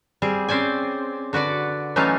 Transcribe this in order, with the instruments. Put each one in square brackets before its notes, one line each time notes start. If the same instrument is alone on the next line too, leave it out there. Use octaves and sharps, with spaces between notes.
[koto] G3 C4 G#4
C4 C#4 C5 D5 G#5
D3 F#4 B4 D5
E3 F#3 A3 C#4 D#4 F4